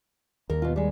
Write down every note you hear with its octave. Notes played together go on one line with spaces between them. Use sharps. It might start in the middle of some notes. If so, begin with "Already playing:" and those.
D#2 A#4
B2 F4
G3 G#3